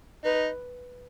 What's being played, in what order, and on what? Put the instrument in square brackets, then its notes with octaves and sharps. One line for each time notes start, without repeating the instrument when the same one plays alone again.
[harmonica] D#4 [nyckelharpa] B4